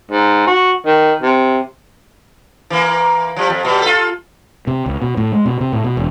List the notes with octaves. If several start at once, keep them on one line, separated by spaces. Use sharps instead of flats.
G#2
F#4
D#3
C3
E3 A#3
F3 G3
F2
B2 G3
F4 A4
C3
C#2
B2
A2
G#3
B2
C3
A2
B2
E1